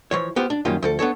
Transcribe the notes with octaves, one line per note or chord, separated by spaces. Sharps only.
E3 F3 C#5
B3 F4 G4 C5
D4
F#2 D#3 G3 A#3 C#4 F4
D2 F3 A4
B3 D4 A4 C#5